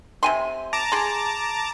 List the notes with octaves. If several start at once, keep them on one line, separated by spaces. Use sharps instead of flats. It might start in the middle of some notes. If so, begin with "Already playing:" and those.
C3 G#5 C6
A5 A#5 D6
G#4 C6